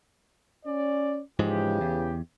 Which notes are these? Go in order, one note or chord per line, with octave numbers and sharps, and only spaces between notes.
C#4 D5
G#2 C#3 E3 F3 G#3 G4
E2